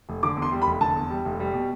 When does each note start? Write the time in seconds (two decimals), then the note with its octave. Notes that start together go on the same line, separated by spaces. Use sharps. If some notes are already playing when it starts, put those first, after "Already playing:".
0.09 F1
0.23 D3 D6
0.37 E2
0.42 C6
0.52 G3
0.62 B5
0.67 F1
0.81 D3 A5
0.96 E2
1.10 G3
1.25 F1
1.40 G3
1.54 B2